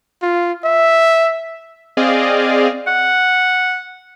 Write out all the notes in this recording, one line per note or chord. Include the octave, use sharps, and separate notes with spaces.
F4
E5
C4 G#4 D5 D#5 F5
F#5